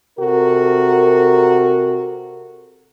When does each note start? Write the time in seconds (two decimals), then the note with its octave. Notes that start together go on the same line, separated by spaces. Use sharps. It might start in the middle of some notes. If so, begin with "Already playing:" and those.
0.19 C3 F#4 A4 A#4